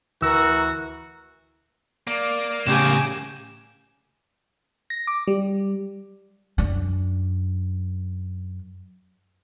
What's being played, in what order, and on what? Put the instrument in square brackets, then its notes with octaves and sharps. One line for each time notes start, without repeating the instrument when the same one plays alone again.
[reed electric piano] D2 E6 [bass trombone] E3 [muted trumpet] F#4 [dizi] A#4
[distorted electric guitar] A#3 [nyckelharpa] D5
[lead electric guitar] A2 C#3 [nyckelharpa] G4 G#5 [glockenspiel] E7
[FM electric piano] A#6
D6
G3
[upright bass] F#2 D4